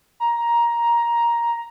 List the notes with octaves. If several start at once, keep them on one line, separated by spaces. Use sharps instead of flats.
A#5